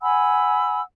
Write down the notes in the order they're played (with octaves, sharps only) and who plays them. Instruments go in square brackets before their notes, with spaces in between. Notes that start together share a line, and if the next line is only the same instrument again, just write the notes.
[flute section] F#5 G#5 B5 E6